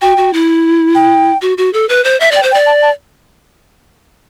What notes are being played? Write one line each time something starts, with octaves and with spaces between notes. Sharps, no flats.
F#4 G5
F#4
E4
G5
F#4
F#4
A4
B4
C5
E5
D5 G5
C5
G5
D5
A5
A5